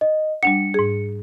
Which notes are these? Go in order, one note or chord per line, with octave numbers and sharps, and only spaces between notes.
D#5
G3 D4 F#5 C#7
G#2 G#4